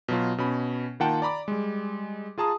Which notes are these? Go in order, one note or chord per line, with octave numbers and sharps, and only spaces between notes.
B2 F#3 F4
B2 C#4 B5
D#3 A#3 F4 F#5 G5 A5
D5 A#5 B5 D6
G3 G#3
F4 G#4 A5 A#5 D#6